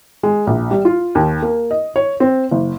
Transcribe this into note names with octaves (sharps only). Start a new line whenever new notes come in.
G#3
A#1
G3
F4
D#2
A#3
D#5
C#5
C4
F#1